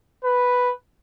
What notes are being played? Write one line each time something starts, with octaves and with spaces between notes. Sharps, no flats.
B4